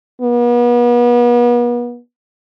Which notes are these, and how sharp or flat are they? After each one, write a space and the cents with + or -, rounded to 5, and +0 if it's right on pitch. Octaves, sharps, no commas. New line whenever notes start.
B3 -40